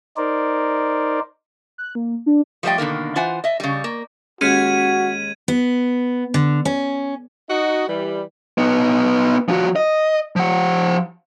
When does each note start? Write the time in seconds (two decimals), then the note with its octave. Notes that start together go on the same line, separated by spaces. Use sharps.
0.17 D#4 A#4 C5 D5
1.78 F#6
1.95 A#3
2.26 D4
2.63 F3 G3 A3 A#4 D#5 G5
2.78 B2 D3 D#3 A#3
3.16 E3 F4 C5 F#5 G#5
3.44 D#5 E5
3.60 C#3 G3
3.84 A#3
4.41 D#2 G#3 C#4 F#4 F6 G#6 B6 D#7
5.48 B3
6.34 D3
6.65 C#4
7.49 D#4 F#4 D#5
7.88 E3 G3
8.58 B3 D#4
9.49 F3 F#4
9.76 D#5
10.36 F3 F#5